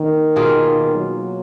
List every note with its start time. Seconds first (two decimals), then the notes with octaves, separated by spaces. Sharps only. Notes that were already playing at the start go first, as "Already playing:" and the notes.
Already playing: D#3 A#3
0.36 B2 A#3 F4 G#4
0.95 F#3